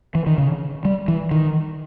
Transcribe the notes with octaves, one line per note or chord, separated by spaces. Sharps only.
E3
D#3
C#3
G3
E3
D#3